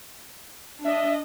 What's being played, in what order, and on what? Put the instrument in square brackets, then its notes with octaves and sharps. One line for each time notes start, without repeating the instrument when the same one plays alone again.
[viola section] D4 D#5 [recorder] E5